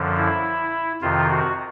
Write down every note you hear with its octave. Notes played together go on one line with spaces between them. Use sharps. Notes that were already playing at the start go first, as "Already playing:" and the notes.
Already playing: F#2 D3 F3
E4
F2 C3 D#3 F4
F#4